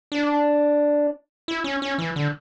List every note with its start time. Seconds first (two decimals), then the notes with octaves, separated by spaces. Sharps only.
0.12 D4
1.48 E4
1.64 C#4
1.82 C#4
1.98 E3
2.16 D3